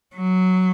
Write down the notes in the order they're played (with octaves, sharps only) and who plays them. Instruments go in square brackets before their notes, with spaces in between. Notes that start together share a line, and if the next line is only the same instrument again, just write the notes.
[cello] F#3